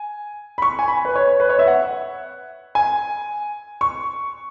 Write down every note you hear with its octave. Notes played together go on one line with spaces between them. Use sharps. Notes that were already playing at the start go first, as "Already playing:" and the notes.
Already playing: G#5
B5
C#6
G#5
B5
B4
C#5
B4
C#5
E5
F#5
G#5
C#6